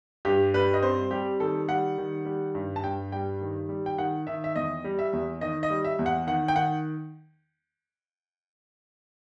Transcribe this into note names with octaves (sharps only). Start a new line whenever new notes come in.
G2 G4
G3 B4
D#5
C4 C5
G3 G4
D#3 A4
G3 F#5
D#3
G3
G2
A5
G2 G5
G3 G5
D#3
G3
G5
D#3 F#5
D#3 E5
E5
E2 D#5
G3
E5
E2
D#3 D#5
D#5
G3
E5
E2
F#5
D#3 F#5
G5
D#3 F#5